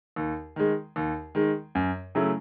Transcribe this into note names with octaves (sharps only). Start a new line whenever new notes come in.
D#2
D#3 G#3
D#2
D#3 G#3
F#2
C#3 F#3 A3 E4